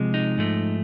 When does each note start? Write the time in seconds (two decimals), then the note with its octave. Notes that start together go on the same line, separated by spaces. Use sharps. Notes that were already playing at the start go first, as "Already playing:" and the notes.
Already playing: C3 F3 G#3
0.14 D#4
0.37 G#2 F3 A3